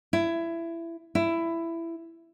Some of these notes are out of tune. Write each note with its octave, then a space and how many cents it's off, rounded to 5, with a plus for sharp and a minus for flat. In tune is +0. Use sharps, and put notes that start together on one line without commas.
E4 +20
E4 +15